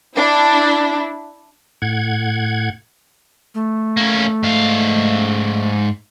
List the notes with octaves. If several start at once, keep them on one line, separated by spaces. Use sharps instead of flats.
D4 E4
A2 F#5 G#6
A3
A#3 C#4
G#2 F5